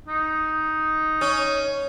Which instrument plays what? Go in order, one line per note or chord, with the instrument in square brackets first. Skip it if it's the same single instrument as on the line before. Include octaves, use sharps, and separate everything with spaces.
[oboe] D#4
[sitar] C#4